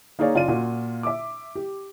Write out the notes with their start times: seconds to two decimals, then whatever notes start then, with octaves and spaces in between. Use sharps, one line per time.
0.19 A#3 D#4 G#4 C#5 D5 F5
0.34 F#1 F4 D5 D#7
0.48 A#2 F4 F#4
1.03 E5 D6
1.55 G4